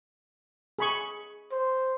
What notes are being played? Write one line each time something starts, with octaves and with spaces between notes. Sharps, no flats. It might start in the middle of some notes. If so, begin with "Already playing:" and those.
G#4 B5 C#6
C5